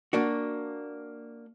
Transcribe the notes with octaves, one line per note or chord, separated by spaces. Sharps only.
A#3 D4 F#4